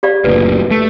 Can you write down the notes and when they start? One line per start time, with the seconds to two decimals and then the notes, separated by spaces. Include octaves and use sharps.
0.03 G4 D5 F5
0.24 F#1 D2 A#2 B4
0.71 A3